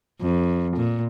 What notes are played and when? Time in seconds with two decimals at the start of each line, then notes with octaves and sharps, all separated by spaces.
0.21 F2
0.76 A#2